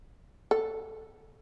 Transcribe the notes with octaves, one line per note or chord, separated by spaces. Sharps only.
A4